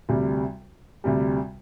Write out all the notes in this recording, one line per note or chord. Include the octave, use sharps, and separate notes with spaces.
D2 C3 G3
D2 C3 G3